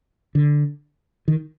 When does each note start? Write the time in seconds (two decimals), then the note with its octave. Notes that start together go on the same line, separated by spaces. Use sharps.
0.35 D3
1.28 D#3